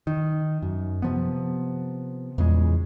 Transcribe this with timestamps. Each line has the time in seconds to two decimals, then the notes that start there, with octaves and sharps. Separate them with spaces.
0.07 D#3
0.62 F#2
1.02 C3 F3 B3
2.38 E2 A#2 C#3 G#3